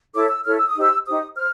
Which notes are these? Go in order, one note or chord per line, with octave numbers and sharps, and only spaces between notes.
E4 A4 C#5 D6
E6
E4 A4 C#5 F6
E6
D#6
D#4 G4 C5 E6
D#4 G4 C5 D#6
C5 F6